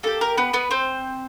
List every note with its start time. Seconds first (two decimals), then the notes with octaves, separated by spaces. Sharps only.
0.03 A#3 D#4 G4 A4
0.21 A#4
0.37 B3 B4
0.53 B3 B4
0.71 C4 C5